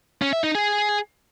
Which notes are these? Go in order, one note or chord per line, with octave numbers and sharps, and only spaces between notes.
C#4
E5
D#4
G#4